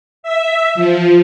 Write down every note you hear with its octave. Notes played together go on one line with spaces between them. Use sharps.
E5
F3